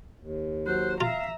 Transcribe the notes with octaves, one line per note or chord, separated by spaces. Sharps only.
D#2
F#3 C5 F#6
F4 E5 F5 A#5